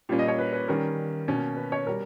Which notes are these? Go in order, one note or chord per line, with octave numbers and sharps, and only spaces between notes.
A#2 G3 A#3 C#4
D#5
C#5
B4
B4
D#3 G3 C#4 A#4
B2 A#3 C#4
B4
C#5
B2 G3 A#4